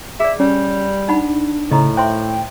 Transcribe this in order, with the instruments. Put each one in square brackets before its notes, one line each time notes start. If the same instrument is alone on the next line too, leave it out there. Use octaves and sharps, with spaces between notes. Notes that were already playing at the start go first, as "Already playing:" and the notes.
[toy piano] G#4 D5 [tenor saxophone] E5
[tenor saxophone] G3 [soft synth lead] C#4
[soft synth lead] D4 [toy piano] D#4 F#5 B5
[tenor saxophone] A2 [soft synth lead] C#3 [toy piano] D#5 A#5
[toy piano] C5 E5 C6 [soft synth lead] G5